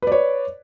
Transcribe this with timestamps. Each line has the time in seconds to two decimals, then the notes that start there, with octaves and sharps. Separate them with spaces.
0.02 B4
0.07 D5
0.12 C#5